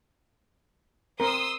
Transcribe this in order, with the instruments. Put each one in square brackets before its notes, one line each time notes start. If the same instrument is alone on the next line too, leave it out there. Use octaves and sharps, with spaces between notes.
[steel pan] C4 A#4 [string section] C6 D#6 E6